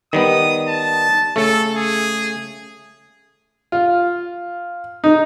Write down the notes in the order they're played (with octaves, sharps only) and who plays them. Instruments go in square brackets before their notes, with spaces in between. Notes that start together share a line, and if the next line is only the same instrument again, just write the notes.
[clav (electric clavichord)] D#3 G3 B3 [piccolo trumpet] D#6
[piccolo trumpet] A5
[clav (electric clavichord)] C#3 A3 [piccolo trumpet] A4
[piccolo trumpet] G#4
[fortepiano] F4
D#4